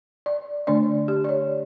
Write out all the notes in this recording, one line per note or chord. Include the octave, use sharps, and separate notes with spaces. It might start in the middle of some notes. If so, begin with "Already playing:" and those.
D5
D3 A3 D4 D5
G4
D5
C#5